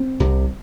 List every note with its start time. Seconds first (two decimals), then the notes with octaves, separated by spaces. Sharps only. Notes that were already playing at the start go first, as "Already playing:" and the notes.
Already playing: C4
0.20 C2 C3